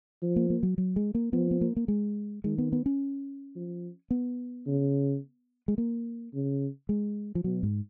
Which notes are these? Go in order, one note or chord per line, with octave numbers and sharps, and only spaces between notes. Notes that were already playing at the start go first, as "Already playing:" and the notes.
F3
A#3
A#3
F#3
F#3
G#3
A#3
F3 B3
B3
A#3
A#3
G#3
D#3 G#3
B3
B3
C#4
F3
B3
C#3
G#3
A#3
C#3
G#3
F3
B2 F#3
G#2